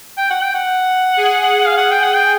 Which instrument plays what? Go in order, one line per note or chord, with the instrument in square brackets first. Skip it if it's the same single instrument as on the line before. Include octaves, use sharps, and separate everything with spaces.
[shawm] G5
F#5
G5
F#5
[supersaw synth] G#4
[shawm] F5
F#5
G5
F#5
G5